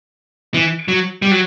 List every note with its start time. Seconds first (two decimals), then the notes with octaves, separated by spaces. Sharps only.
0.54 E3
0.88 F#3
1.22 G3
1.31 F#3